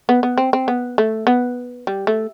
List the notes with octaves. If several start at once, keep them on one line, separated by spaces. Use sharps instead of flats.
B3
B3
C4
C4
B3
A3
B3
G3
A3